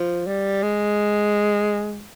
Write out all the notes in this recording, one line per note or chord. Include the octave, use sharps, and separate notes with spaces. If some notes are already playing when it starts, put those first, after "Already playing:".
Already playing: F3
G3
G#3